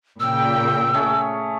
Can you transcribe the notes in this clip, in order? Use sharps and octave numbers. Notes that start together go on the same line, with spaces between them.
A#2 C#3 G5 E6
A3 C#4 G#4